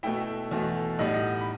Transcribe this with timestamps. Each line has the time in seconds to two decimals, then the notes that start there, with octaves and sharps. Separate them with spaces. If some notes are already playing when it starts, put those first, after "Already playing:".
0.03 B2 A3 E4 E5 G5
0.51 E2 B2 A3
0.99 A2 G3 D#4 D#5 F#5
1.14 D#5 F#5
1.41 B5